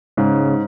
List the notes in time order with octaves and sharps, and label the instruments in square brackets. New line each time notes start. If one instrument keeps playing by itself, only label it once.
[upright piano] G#2 [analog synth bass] C#3